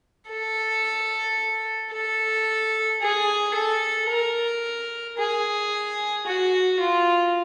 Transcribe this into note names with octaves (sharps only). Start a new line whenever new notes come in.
A4
A4
G#4
A4
A#4
G#4
F#4
F4